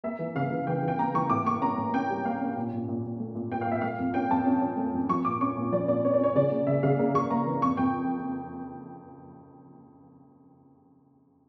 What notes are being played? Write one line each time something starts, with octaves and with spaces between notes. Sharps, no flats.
A#3 E5
E3
C#3 F5
E3
E3 G5
E3 G5
A#3 A#5
E3 C#6
A2 D6
A#3 C#6
C#4 A#5
A2
C#4 G5
G3
A#3 F5
C#4
A#2
A#2
A#2
A#2
A3
A#2
A#2 G5
F5
A#2 E5
A3 F5
F2
C#4 G5
F2 A5
C#4
C#4
A3
F2
F3 C#6
A#2 D6
C#4 C#6
A#2
F3 D5
A#2 D5
C#4 C#5
D5
C#4 C#5
C#3 D5
A#3
C#3 E5
C#3 F5
A#3
C#3 C#6
A#3 A#5
E3
F2 C#6
F2 G5